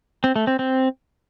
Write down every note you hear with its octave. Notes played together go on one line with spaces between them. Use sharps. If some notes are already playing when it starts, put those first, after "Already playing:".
C4
A3
C4
C4